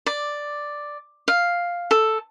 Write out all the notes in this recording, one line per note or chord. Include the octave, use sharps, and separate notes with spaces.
D5
F5
A4